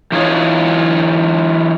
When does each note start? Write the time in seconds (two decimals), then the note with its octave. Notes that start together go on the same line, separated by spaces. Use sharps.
0.12 E3 D#4 F4 C#5